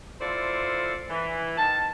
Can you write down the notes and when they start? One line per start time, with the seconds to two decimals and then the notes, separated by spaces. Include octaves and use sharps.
0.21 E4 F4 A4 C5 D5
1.10 E3
1.58 D#3 A5